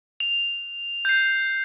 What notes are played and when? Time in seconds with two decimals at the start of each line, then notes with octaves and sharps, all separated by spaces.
0.20 F7
1.05 G6 C7